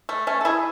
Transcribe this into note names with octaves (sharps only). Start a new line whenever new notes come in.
A3
A3 C#4
A4
E4 G#4